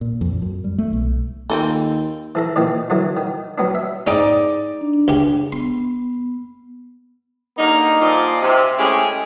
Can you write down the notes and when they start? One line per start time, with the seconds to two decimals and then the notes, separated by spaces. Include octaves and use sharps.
0.01 A#2
0.21 F2
0.42 F#2
0.64 G3
0.78 A3
0.93 B1
1.50 D#2 C4 F4 A4
2.35 E3 A4 A#5
2.56 A#2 D#3 E3 D5
2.90 F#2 D3 E3 F#3
3.17 D#3
3.58 F#3 B3 D4
3.75 E5
4.07 G#2 C4 C#4 D#4 D5
4.81 D4
5.08 C#2 C#3 G4
5.52 B3 C6
7.58 D3 G3 A#3 D#4
8.01 A#2 F3 D#4 F4 D5 D#5
8.42 C3
8.78 G#3 A3 C#4 E4 G4 G#4